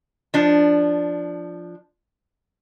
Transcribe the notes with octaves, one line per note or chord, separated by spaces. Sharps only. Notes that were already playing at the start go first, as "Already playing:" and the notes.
F3 D4